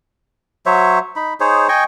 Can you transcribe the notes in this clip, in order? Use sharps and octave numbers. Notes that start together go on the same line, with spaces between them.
F#3 C5 C#5 E5
D#4 B5
D#4 G#4 C5 C#5
D#5 G5 G#5 C#6